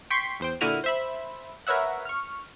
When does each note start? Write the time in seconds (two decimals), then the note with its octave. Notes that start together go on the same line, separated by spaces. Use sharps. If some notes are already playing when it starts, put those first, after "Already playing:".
0.10 G5 C6 C#6 B6 C7
0.40 E2 C5 G5
0.61 A#2 D3 E4 F#4 F6 D#7
0.84 C5 E5 B5
1.67 A#4 B4 C#5 E5 F#5
2.05 C#6 F6